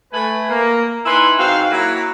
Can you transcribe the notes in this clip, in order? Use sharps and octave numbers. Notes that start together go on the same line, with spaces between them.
A3 B4 G#5
A#3
D#4 E4 B4 G#5 C6
G#2 C4 F#4 C5 F5
F#3 A#3 E4